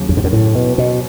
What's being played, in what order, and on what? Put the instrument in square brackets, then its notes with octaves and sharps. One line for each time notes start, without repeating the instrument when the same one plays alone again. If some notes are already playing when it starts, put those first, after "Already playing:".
Already playing: [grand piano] D#2 C#3 F#3
[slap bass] F#2
G#2
F#2
A2
B2
B2